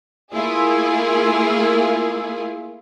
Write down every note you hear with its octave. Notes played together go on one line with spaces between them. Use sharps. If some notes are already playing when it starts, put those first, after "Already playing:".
A3 A#3 E4 F4 G#4